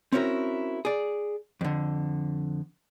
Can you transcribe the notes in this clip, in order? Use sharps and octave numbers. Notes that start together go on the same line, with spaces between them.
C4 C#4 E4 F#4 A#4
G#4 D5
F2 D3